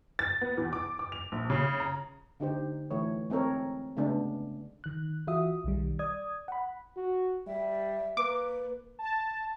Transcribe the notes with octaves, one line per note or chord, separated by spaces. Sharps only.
A6
B3
E2
D6
D6
F7
A#1
C#3
A#5
D3 D#4 G4 C5
E3 A3 C#5
G#3 C4 A4 A#4 C#5
C#3 G#3 A3 B3 C#4 D4
D#3 F#6
E3 F4 F#4 E5 D#6
B1 D#3 G3
D5 D#6 G#6
F#5 B5
F#4
G3 E5
A#3 B4 D6
A5